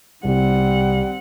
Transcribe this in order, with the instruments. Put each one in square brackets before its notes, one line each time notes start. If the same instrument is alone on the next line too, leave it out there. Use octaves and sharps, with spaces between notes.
[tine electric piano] C2 C3 [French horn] G3 [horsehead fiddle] C4 F#5